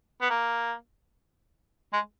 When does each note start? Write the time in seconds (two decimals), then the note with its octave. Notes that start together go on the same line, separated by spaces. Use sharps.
0.22 B3
0.30 A#3
1.93 G#3